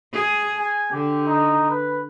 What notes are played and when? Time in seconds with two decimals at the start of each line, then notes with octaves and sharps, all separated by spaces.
0.13 G#4
0.57 G#5
0.92 D3 G4
1.27 D#4
1.70 B4